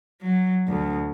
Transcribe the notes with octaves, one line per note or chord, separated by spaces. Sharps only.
F#3
D2